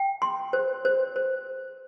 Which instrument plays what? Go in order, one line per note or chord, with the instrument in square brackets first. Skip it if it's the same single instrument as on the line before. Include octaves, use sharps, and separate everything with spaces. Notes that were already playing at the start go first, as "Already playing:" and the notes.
Already playing: [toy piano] G5
C6
C5
C5
C5